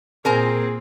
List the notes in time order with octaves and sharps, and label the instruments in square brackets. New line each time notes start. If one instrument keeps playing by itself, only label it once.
[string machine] A#2 [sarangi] C4 [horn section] G#4 [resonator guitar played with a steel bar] A#4 G#5 A#5